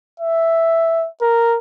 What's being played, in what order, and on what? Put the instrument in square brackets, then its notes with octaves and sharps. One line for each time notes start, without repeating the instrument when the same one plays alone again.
[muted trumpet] E5
A#4